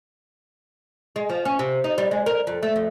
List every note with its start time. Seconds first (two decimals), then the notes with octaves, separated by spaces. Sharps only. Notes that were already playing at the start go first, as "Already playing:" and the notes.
1.16 G#3
1.29 F3
1.45 C#4
1.59 C3
1.84 D#4
1.98 G3
2.11 G#3
2.26 A#4
2.47 F2
2.63 A3
2.76 F2